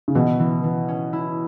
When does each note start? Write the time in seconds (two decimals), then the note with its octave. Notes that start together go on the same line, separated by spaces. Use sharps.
0.08 C#3
0.15 B2 E3
0.40 E3
0.64 E3
0.88 C#4
1.13 E4